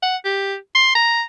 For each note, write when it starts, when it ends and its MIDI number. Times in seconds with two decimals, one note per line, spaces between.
0.03 0.17 78
0.25 0.56 67
0.75 0.92 84
0.95 1.23 82